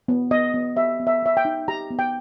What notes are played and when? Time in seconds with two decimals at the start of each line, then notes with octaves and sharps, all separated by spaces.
0.08 B3
0.31 B3 D#5
0.54 B3
0.76 G4 E5
1.00 B3
1.07 E5
1.22 B3 E5
1.37 G5
1.45 D#4
1.68 G4 A#5
1.90 B3
1.99 G5